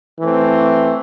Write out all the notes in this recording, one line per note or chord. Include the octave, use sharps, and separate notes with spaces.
E3 A3 C4